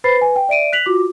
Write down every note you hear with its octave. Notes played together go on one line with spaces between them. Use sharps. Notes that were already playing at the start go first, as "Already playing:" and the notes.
B4 C5 B5 A6 C7
B4 G#5
G5
D5 E5 D7 D#7
F#6 B6 F7 F#7
F4 F#4 D6